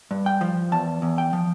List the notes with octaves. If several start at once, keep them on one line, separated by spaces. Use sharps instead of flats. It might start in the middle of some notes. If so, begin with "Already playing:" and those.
G2
G5
F3
E2 A5
E2
G5
F3